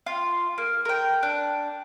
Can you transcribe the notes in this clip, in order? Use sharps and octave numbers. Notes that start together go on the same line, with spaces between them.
F4
A#3
A#4 G5
D4 F#6